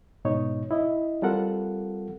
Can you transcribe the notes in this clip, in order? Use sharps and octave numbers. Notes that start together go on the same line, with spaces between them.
G#2 B2 D#4 C#5
E4 D#5
G3 C4 F4 A4 A#4 F#5